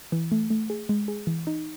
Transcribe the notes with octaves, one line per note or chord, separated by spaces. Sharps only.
E3
A3
A3
G#4
G#3
G#4
E3
D#4